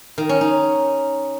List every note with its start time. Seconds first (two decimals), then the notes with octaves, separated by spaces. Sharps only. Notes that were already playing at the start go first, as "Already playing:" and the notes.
0.18 D#3
0.29 C#4
0.41 D#4